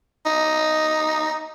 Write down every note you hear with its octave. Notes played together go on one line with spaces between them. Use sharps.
D#4